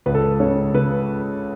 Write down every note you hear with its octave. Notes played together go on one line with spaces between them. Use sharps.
C#2 B4
A4
B4
C#3 C#5
C#3 B4